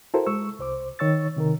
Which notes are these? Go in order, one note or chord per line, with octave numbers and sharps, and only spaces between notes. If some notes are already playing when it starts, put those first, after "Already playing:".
E4 F#4 A4 A#4 C5
G#3 C#6 E6
C2 C5 D6
D#3 C#5 C#6 E6 A6
C3 D#3 A#4